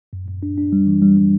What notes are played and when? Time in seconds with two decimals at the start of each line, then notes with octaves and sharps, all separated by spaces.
0.13 F#2
0.28 F#2
0.43 D4
0.58 D4
0.72 G3
0.87 E3
1.02 G3
1.17 G3